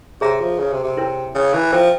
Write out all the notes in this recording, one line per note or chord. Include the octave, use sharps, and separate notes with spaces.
C3 G#4 C#5 E5 A#5
F3
C#3
C3
C3
E4 A#4 C#5 G5
C#3
E3
F3 E4 A#4 E5 G5